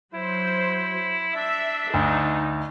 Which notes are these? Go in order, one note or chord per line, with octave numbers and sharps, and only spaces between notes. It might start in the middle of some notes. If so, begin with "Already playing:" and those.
F#3 E4 C5
D4 E5
D2 D#4